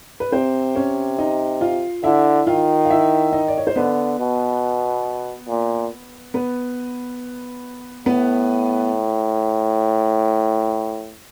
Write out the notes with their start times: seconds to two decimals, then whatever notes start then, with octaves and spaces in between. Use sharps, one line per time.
0.20 B4
0.31 C3 C4 C5
0.75 C#4 C#5
1.19 D#4 D#5
1.61 F4 F5
2.04 D3 E4 E5
2.47 D#3 F4 F5
2.85 F5
2.90 E4 E5
3.33 D#4 D#5
3.48 D5
3.58 C#5
3.67 C5
3.76 D3 B3 B4
4.19 B2
5.48 A#2
6.34 B3 B4
8.06 A2 B3 B4